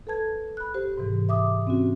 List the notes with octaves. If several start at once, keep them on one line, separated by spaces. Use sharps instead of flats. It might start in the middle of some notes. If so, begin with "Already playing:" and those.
A4 B4 A5 G#6
B5 F#6
G4 C5
G#2 C3 E3
E5 D6 D#6
C4 C#4 F#4